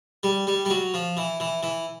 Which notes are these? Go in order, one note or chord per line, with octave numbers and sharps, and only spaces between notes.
G3
G3
G3
F#3
F3
E3
E3
E3